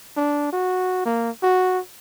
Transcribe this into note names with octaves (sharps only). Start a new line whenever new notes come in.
D4
F#4
A#3
F#4